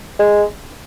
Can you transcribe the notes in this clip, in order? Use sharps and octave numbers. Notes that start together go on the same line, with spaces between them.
G#3